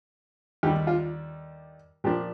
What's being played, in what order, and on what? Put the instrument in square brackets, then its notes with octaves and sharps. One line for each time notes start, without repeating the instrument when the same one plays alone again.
[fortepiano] D#2 D3 G3 G4
F4
A#2 F3 A#3 D4 G4